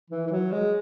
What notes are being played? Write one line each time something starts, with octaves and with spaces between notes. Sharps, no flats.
E3
E3
F#3
G#3